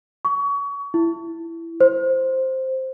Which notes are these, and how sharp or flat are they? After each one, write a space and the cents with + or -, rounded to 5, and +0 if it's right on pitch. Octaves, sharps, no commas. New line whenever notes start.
C#6 +30
E4 +10
C5 +5